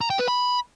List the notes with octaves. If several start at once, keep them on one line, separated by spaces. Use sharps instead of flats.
A#5
G5
B4
B5